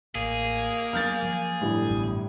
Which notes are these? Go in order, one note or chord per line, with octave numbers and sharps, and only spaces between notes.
A1 A#3 G#4
F#3 B3 D4 F6 G6 A6
F3 F#3
G1 A2 G3
A1 F#2 B2